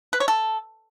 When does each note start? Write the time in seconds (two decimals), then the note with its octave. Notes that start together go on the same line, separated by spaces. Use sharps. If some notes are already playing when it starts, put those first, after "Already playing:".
0.13 B4
0.20 C#5
0.28 A4